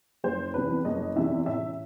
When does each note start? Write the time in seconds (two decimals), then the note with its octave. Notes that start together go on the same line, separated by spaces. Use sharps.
0.24 F#1 C5
0.54 E2 C3 E3 B4
0.85 F#1 D#5
1.16 E2 C3 E3 E5
1.46 A1 E5